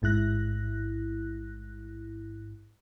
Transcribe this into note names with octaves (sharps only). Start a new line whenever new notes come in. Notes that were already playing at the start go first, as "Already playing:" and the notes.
A1 G#2 E4 F#6 A#6